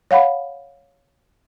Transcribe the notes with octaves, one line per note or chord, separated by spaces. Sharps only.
C#5 F5 F#5 B5